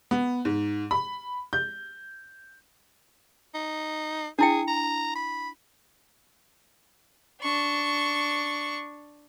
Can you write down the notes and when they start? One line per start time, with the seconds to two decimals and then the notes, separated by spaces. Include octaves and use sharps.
0.11 B3
0.45 G#2
0.91 B5
1.53 G6
3.54 D#4
4.39 D4 E4 G#4 G5
4.68 A#5
5.16 B5
7.42 D4 C#6